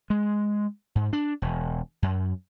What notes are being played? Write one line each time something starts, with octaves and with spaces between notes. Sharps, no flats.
G#3
G#2
D4
E1
F#2